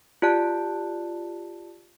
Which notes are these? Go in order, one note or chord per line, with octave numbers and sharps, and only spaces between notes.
F4 G4 D5 A5 F#6